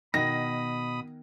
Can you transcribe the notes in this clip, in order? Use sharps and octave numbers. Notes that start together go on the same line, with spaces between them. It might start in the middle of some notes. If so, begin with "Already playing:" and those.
B2 D#3 B5 D#6 A#6